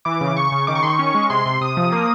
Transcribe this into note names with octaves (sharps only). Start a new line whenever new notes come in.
E3 D6
C#3
C#3 C#6
C#3
D#3 D6
C#6
D#3 C6
C#6
C#4
G#3
C3 C6
C3
C3 D#6
F3
A#3